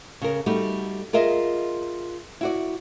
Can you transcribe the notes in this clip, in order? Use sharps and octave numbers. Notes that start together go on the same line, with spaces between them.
C#3 A#4
G3 A3 D#4 F#4
F4 G#4 A#4 D#5 E5
E4 F#4 D5